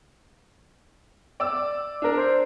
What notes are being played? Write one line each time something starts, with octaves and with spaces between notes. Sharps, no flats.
D5 E6
D4 A#4
C5